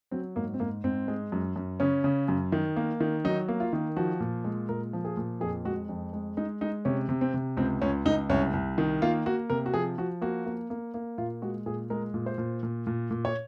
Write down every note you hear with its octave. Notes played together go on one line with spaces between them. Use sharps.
F#3 C4
G#2 A#3
C4
G#2 A#3
G#2 C4
G#3
F#2
F#2
C#3 C#4
C#3
F#2
D#3
A#3
D#3
F#3 D#4
A#3
F4
D#3
F3 F#4
A#2
G#3
A#2 A#4
F3
G#4
A#2
F2 G#4
G#3 F#4
F2
G#3
G#3 D#4
G#3 D#4
C3 C#4
C3
C4
C3
C#2 C4
C#2 C#4
C#2 D#4
C2 C#4
C2
D#3
A#3 F4
A#3 F#4
C3 A#4
F#4
F3 G#4
F3 F#4
A#3 F#4
A#3
A#3
A#3
A#2 F4
G#3 F#4
A#2 G#4
G#3 A#4
A#2
C5
A#2
A#2
A#2
A#2
C#5